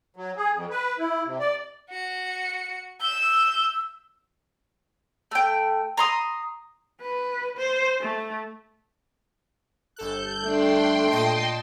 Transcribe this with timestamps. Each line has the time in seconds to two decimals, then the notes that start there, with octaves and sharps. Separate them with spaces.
0.16 F#3
0.36 G#4
0.54 F2
0.70 B4
0.98 E4
1.25 C3
1.40 D5
1.90 F#4 C#7
3.01 E6 G6 E7
5.31 A3 G5
5.97 A#5 C6 D#6
7.01 B4
7.57 C5
8.01 A3
9.96 G1 A4 F#6 G6
10.44 A3 D4 G5 C6
11.11 A#2 D#5 A5